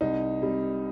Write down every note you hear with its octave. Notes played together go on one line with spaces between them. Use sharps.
C2 D#4
C3 G3